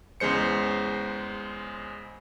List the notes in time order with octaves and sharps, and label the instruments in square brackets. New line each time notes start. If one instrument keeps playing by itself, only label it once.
[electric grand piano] E2 C#3 G#3 C5 C#7